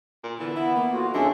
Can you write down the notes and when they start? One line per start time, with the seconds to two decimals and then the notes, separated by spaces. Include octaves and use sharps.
0.23 A#2
0.39 D3 E3 B3 A4
0.56 B3 E4
0.75 A#3
0.93 A2 F4 F#4
1.14 F2 D3 F3 G#3 B3 C#4 E5